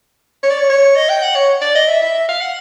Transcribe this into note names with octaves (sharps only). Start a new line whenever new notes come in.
C#5
D5
C#5
C#5
D#5
G5
F#5
C#5
D5
D#5
E5
E5
F5
F#5